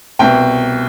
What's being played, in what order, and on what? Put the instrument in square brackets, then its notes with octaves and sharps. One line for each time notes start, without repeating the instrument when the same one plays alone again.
[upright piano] C2 B2 G5